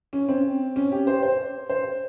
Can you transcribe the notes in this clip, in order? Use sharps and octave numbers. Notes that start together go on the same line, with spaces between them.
C#4
C4
C#4
G4
C5
C5
C5